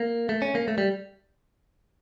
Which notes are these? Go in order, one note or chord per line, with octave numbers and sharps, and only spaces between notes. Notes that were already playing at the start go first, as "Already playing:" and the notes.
Already playing: A#3
A3
C#4
A#3
A3
G3